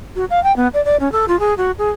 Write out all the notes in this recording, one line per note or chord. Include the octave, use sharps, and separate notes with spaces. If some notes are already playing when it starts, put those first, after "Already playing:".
F#4
F5
G5
B3
D5
D5
C#4
A4
F4
G#4
F#4
G#4